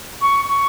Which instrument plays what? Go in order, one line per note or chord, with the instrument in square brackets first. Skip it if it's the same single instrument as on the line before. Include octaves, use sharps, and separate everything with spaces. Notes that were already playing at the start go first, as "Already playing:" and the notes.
[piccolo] C#6
C#6